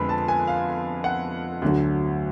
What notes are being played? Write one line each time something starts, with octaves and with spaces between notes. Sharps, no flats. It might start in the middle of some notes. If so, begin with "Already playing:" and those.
Already playing: F2 D3 G#3 B3 B5
A5
G#5
F5
F#5
D2 D3 F#3